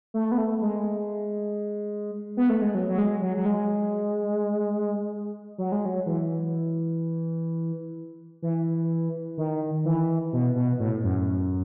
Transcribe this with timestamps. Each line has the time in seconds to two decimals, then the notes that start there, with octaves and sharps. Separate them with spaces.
0.14 A3
0.32 B3
0.38 A3
0.62 G#3
2.37 B3
2.49 A3
2.62 G#3
2.75 F#3
2.89 F#3
2.98 G#3
3.22 F#3
3.37 F#3
3.46 G#3
5.58 F#3
5.72 G#3
5.85 F#3
6.06 E3
8.42 E3
9.38 D#3
9.85 E3
10.33 B2
10.56 B2
10.79 A2
11.04 F#2